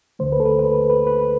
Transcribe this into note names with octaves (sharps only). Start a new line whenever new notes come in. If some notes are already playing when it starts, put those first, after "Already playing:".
D2 D3 A3 C5
B4
A4
B4
B4
B4
B4